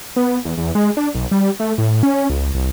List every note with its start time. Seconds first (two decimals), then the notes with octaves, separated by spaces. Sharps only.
0.16 B3
0.45 E2
0.58 E2
0.75 G#3
0.97 D4
1.15 B1
1.31 G3
1.60 A3
1.78 A2
2.03 C#4
2.30 C#2
2.55 C2